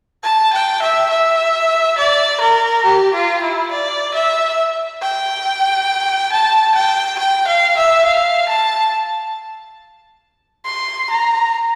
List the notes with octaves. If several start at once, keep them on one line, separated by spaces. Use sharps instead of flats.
A5
G5
E5
E5
D5
A#4
G4
F4
E4
D5
E5
G5
A5
G5
G5
F5
E5
F5
A5
C6
A#5